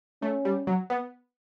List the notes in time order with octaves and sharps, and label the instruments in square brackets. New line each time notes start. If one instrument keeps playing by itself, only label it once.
[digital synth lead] A3 [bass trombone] C#4
[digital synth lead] G3
F#3
B3